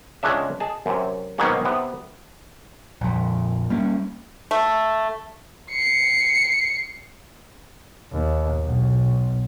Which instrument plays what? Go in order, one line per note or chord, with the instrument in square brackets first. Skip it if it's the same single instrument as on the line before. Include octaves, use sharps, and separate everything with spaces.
[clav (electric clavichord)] C#2 G#3 C#4 D4 E5
G#4 D#5 A5
F#2 C3
G#2 B2 D#3 F#3 A#3 C#4
C3 B3
[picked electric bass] A#1 F2
G3 A#3 C#4
[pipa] A3
[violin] C7 C#7
[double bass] D#2
B1 B2